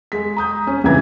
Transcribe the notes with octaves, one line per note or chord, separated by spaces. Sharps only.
G#3 B6
A#5 D#6 G6
C#4
C#2 C3 E3 A#5 G#6